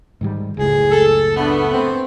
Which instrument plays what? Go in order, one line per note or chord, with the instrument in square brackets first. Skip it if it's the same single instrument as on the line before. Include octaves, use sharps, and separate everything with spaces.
[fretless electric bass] G#2 D#3 G3
[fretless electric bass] F#1 C#2 A2 [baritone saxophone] G#4
[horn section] A4
[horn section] A3 B3 [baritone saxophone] D4
[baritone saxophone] C4